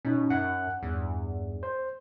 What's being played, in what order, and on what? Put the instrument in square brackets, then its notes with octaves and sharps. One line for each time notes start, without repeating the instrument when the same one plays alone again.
[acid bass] B2 [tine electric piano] C#4 D#4
[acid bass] F#2 [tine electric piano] F#5 F#6
[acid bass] E2 [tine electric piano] G2
[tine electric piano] C5